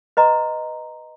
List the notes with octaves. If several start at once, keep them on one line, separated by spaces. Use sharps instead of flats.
B4 D#5 A#5 C6